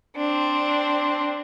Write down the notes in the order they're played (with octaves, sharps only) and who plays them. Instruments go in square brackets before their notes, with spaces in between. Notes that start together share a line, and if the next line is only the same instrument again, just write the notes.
[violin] C4 D4